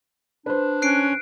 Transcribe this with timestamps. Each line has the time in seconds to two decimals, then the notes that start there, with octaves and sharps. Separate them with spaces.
0.46 D4 B4 C5
0.82 C#4 F#6 C7 D7